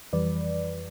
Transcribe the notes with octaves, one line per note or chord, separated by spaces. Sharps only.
F2 E3 G3 B4 D5